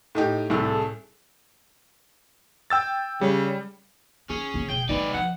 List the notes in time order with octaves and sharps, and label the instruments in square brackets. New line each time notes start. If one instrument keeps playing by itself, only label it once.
[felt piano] A2 D#4 G4
[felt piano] C2 A2 A3 [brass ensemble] G#4 A4
[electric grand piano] G5 E6 A6
[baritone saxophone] C#3 [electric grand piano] G3
[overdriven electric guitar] C#4 [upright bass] D#4 [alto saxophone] G#4
[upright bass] C#3 B3
[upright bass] E1 [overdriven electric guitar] G5
[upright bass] G#3 B3 [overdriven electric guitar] D#4 B4 [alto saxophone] D5
[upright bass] F3 [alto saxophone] F#5